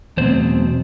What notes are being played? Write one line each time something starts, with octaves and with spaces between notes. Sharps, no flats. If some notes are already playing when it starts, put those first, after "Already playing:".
E2 B2 F#3 A3 C4 C5